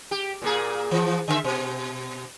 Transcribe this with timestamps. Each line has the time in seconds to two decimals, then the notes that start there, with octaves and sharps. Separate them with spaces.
0.11 G4
0.42 A#2 A#3 G#4
0.91 E3 F3
1.28 D3 D#3 E5
1.44 B2